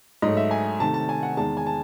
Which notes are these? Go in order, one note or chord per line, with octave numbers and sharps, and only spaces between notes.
G#2 F#3 A3 D#5
E5
G#5
C3 D#3 A3 A5
A5
G#5
F#5
E2 D#3 G#3 A5
G#5
A5